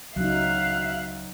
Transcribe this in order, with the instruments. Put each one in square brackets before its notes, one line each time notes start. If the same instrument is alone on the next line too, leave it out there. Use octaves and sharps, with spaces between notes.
[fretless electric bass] C#2 [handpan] F#3 D#4 [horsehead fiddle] E5 F5 [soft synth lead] F#6